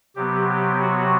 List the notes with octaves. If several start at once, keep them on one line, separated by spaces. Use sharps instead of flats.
C3 F#3 B3 G4
G4
F#4